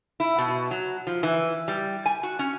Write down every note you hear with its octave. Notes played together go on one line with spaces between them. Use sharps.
E4
B2
F#3
F3
E3
G3
G#5
F#4
C#4